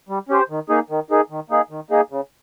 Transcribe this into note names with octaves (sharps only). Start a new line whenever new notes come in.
G3
C#4 G4 C5
D#3
A#3 D#4 G#4
D#3
A#3 D#4 G#4
D#3
A#3 D#4 G#4
D#3
A#3 D#4 G#4
C#3